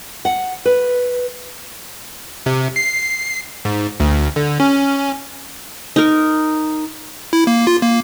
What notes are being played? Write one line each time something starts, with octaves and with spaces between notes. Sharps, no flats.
F#5
B4
C3
C7
G#2
D2
D3
C#4
D#4 A#4
E4
A#3
F4
A#3